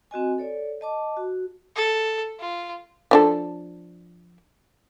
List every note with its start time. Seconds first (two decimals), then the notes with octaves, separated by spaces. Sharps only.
0.11 C4 F#4 D#5 G#5
0.38 A4 C#5 D5
0.81 D#5 A5 D6
1.17 F#4
1.76 A4
2.40 F4
3.11 F3 D4 A4